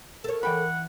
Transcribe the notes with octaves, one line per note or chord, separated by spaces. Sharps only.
A4 A#4 C#5
E3 F#5 G5 B5